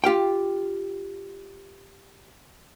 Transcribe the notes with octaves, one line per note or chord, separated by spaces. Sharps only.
F4 G4 F5 G5